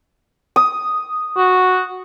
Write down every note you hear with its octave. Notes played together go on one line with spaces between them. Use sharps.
D#6
F#4